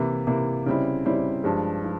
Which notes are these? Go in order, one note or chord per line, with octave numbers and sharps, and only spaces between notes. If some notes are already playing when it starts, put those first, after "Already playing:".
Already playing: C3 E3 A#3 E4
C3 E3 A#3 E4
C#3 G3 C4 E4
C#3 G3 C4 E4
G2 F3 G#3
F3